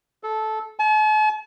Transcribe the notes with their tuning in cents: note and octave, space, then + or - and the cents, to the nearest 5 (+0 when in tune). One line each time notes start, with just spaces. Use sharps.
A4 -15
A5 -45